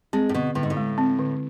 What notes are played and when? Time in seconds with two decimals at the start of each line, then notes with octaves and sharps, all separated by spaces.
0.13 G#3 C4
0.29 A2
0.34 B2 D3
0.55 A2 D3
0.63 G#2
0.70 A2
0.77 G#3
0.98 C4
1.19 D3